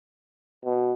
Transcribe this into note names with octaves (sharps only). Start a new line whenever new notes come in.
B2